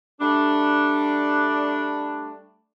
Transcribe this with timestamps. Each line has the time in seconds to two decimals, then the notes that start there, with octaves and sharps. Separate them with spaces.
0.21 G3 A3 D4